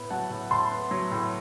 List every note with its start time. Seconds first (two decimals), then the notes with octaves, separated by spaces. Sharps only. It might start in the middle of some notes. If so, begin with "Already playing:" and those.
Already playing: A2 B3
0.10 F#3 F#5 A5
0.30 A2
0.51 A2 A5 C6
0.71 B3
0.91 F#3
1.11 A2